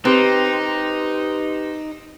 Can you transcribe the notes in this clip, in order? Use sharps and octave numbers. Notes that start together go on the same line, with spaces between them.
C4 D#4 G4 B4